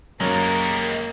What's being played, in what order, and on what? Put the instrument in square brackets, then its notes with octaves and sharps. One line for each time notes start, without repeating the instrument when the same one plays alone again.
[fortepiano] F#2 [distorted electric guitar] G3 G#3 [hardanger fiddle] A#3 [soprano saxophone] A#4